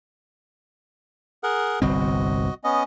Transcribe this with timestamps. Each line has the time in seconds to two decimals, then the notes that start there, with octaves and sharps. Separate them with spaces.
1.43 G#4 A#4 F#5
1.82 G1 C2 C4 F#4 D#5
2.64 B3 C#4 D#5